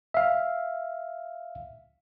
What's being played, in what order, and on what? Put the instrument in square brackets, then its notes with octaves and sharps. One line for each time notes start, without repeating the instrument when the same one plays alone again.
[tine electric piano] E5 F5